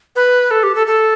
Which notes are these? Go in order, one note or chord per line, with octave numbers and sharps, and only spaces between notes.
B4
A4
G4
A4
A4